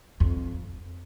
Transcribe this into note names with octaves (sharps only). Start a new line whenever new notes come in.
F2